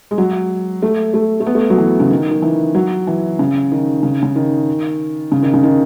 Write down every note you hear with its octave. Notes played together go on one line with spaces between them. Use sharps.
G#3
F#3
A3
A3
A3
B3
A3
F#3
E3
C#3
D#3
D#3
E3
F#3
E3
C#3
D#3
C#3
C#3
D#3
C#3
D#3
C#3
D#3